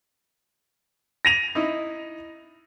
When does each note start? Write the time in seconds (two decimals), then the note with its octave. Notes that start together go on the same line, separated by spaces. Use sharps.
1.25 A#6 D#7 F7
1.55 D#4 E4